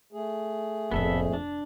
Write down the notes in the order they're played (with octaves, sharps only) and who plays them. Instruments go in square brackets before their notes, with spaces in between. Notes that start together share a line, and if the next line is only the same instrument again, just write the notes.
[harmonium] A3 G#4
[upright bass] F1 A2 [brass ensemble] A#1 F2 [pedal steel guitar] B3 A4 E5
[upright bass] F1 [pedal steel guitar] D4